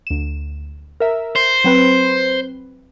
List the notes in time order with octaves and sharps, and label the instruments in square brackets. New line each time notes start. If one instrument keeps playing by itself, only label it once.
[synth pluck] D2 E7
A#4 E5
[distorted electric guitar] C5
[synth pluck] F#3 C4 B4